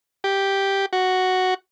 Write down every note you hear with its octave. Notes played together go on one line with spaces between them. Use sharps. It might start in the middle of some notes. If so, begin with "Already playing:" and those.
G4
F#4